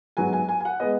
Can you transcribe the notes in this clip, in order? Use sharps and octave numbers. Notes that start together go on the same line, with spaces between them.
G#2 F#3 B3 G#5
G#5
G#5
G#5
F#5
G#3 B3 D#5